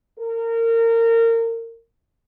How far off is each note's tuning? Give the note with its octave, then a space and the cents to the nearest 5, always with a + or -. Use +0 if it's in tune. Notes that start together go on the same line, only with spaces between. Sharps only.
A#4 -25